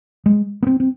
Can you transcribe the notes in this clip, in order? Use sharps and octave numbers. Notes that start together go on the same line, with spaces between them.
G#3
B3
C4
C4